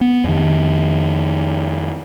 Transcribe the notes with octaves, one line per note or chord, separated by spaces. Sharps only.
B3
F2 D#3